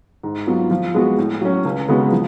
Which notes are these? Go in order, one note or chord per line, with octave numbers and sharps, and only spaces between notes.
G#2
F#3 B3 F4
F3
G#3 B3 F#4
A2
F#3 C#4
C#2
C#3 G#3 B3 F#4
F3